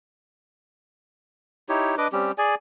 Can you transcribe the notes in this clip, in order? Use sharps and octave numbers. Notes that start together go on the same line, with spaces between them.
D#4 E4 G4 C#5
D4 B4 D#5 D6
G3 C4 C#4 G4
G#4 D5 G#5